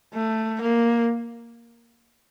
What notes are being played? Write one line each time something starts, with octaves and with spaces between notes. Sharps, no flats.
A3
A#3